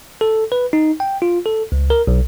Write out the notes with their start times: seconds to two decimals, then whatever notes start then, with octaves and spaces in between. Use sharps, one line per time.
0.21 A4
0.52 B4
0.73 D#4
1.00 G5
1.22 F4
1.46 A4
1.72 C#2
1.90 A#4
2.07 B1